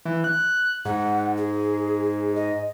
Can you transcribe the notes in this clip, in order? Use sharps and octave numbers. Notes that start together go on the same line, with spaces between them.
E3
F#6
G#2 F#5
G#4
D#5